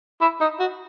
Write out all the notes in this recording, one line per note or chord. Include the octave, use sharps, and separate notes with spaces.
E4
D#4
F#4